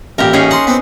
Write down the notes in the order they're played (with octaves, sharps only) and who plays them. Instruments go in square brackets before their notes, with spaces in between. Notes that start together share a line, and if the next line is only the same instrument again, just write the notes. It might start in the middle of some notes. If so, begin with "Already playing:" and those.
[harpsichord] A1 A#2 [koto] G4 A#4
[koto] C#4 D#4 G#4
[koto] F#5 [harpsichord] A#5 C6
[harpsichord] B3 C4